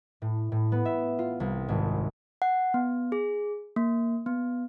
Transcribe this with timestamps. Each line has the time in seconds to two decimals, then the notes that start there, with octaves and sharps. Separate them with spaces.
0.22 A2
0.52 A2
0.72 B3
0.85 E5
1.19 F4
1.40 C2
1.69 G#1
2.42 F#5
2.74 B3
3.12 G#4
3.76 A#3
4.26 B3